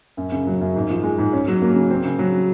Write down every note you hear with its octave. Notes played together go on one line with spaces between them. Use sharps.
F#2
C#3
F#3
F#2
G#2
F3
G#3
G#2
C#4
F#3
A#3
C#3
C4
C#3
F#3